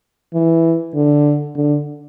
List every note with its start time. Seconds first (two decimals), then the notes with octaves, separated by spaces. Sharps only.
0.34 E3
0.95 D3
1.56 D3